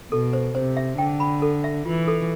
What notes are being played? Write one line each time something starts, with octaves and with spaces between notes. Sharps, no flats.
B2 A4
C5
C3 C5
E5
D3 G5
B5
A4
E5
E3 F4
A4